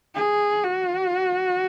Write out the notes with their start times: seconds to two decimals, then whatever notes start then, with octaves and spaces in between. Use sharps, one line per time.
0.15 G#4
0.63 F#4